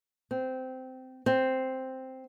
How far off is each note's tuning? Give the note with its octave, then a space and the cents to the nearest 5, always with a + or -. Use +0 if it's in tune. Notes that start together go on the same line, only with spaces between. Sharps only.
C4 -15
C4 +0